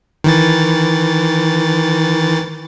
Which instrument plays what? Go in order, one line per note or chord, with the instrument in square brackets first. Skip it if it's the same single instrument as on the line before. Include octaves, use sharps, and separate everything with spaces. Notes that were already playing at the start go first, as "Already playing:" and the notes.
[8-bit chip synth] D#3 E3 A6